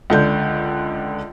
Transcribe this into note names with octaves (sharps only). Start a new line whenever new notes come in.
C#2 D3 G6